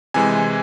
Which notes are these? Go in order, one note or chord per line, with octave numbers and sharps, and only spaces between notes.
C3 E3 G#3 G#5